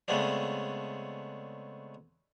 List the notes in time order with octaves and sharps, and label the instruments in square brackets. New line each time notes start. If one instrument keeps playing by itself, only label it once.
[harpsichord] C#3 G#3 A3 B3 C4 D4